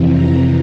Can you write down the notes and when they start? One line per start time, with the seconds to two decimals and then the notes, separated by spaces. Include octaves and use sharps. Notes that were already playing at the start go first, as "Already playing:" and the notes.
Already playing: F2 C3 E3
0.09 A#5